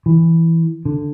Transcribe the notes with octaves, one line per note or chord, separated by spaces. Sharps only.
E3
D3